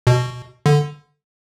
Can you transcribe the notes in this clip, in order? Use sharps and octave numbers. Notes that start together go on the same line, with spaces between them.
B2
D3